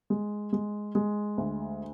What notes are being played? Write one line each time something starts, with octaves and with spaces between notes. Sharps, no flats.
G#3
G#3
G#3
D2